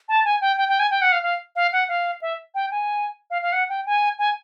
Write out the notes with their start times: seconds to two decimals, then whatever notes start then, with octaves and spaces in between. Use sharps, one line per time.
0.09 A5
0.25 G#5
0.41 G5
0.57 G5
0.69 G5
0.79 G#5
0.91 G5
1.02 F#5
1.12 F5
1.23 F5
1.56 F5
1.73 F#5
1.89 F5
2.22 E5
2.55 G5
2.71 G#5
3.31 F5
3.42 F5
3.53 F#5
3.69 G5
3.86 G#5
4.19 G#5